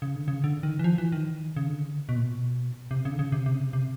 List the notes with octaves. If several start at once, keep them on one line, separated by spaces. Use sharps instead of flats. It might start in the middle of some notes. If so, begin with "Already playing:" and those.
C#3
D3
C#3
D3
D#3
E3
F3
E3
D#3
C#3
D3
B2
A#2
B2
C3
C#3
D3
C#3
C3
C3
C#3
C3
C3